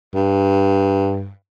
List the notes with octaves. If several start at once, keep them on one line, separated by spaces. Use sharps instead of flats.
G2